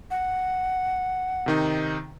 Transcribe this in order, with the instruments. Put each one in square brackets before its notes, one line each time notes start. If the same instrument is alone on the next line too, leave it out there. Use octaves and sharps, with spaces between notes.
[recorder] F#5
[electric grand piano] C3 D#3 D#4